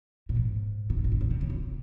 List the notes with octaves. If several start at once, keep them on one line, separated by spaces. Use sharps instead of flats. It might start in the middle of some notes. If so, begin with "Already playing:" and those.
A#2
G#2
C3
A#2
G#2
G2
A#2
C3
C#3
C3